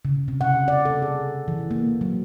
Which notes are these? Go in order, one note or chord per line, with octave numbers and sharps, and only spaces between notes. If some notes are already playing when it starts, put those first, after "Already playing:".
C#3
C3
F#5
D5
A4
G#4
E3
A#3
F#3